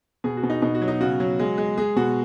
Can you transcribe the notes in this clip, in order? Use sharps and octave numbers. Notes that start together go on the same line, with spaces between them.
B2 G#4
F#4
B2
D#4
B2 D#4
F#4
F#3
D#4
C#3 F#4
F#3
G#3
G#3
G#3 G#4
B2 F#4